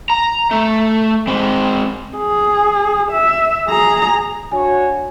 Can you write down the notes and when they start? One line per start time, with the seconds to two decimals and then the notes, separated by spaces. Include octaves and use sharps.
0.10 A#5
0.51 A3
1.27 G#3 C4
2.16 G#4
3.12 E5
3.68 G#4 A#5
4.52 D4 F#4 C#5 G#5